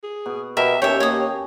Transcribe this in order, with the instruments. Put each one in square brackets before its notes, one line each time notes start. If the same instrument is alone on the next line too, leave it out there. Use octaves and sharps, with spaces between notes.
[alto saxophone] G#4
[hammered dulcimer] B2
[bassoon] B2 [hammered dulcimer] G4 [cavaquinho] A#4 [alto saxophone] E5
[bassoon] D#2 [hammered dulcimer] C#4 G4 A5 [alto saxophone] C#5 [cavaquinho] E5 G5
[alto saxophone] A#3 [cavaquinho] C#5 D#6